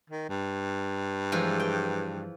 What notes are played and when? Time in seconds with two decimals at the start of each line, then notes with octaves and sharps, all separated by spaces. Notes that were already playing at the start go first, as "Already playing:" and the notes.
0.10 D#3
0.29 G2
1.32 E3 F3 G#3
1.60 G5